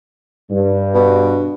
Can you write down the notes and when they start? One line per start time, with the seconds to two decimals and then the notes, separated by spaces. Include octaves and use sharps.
0.50 G2
0.94 B2